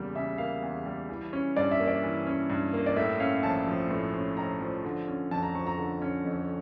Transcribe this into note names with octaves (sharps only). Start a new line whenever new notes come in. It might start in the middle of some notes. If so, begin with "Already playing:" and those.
Already playing: E2 C#3 G3 A#3
C#3 E5
A#3 F5
E2
G3
E3
C#4
G2 D5
E5
A#3
D5
E3
C#4
G2
A#3
D5
A2 E5
C#4 F5
A#1 A5
F3
A2
C#4
A#1 A#5
F3
D3
C#4
F2 A5
A#5
F3 C#6
A#5
D3
C#4
F2